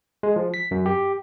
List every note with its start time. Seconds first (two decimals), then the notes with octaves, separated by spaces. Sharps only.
0.23 G#3
0.36 F3
0.54 B6
0.71 F#2
0.86 G4